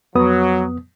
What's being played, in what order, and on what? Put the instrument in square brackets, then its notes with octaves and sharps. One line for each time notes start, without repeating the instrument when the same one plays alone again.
[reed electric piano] F2 B3 D#6 [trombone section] F#3